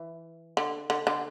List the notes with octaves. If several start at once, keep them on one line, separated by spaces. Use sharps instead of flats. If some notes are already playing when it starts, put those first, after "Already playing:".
Already playing: E3
D3
D3
D3